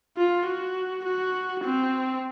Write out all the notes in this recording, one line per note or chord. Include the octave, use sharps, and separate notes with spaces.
F4
F#4
F#4
C4